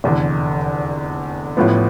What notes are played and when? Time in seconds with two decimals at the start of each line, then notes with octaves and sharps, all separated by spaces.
0.04 F1 E2 D3
1.57 A1 A2 F3 B3